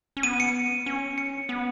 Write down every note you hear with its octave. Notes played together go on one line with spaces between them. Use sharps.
C#4
B3 D#7
C#7
C#4
C#7
B3